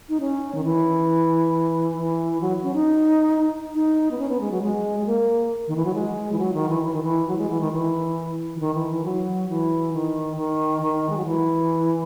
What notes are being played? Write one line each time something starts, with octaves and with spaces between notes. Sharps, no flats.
D#4
C#4
D#3
E3
E3
F#3
C#4
D#4
D#4
B3
C#4
B3
G#3
F#3
G#3
G#3
A#3
D#3
E3
F#3
G#3
E3
F#3
D#3
E3
E3
D#3
E3
F#3
G#3
E3
D#3
E3
E3
D#3
E3
E3
F#3
E3
D#3
D#3
D#3
G#3
F#3
E3